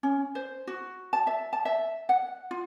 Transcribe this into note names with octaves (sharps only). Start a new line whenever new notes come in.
C#4
C5
F#4
A5
E5
A5
E5
F#5
F4